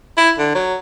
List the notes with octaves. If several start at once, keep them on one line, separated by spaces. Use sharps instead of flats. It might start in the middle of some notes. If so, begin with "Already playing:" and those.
E4
D3
F#3